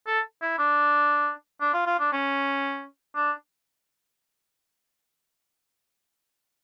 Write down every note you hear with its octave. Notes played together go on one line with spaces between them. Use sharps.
A4
E4
D4
D4
F4
F4
D4
C#4
D4